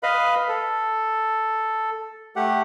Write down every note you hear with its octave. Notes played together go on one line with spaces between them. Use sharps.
B4 D#5 F5 B5
A4
A3 G4 F#5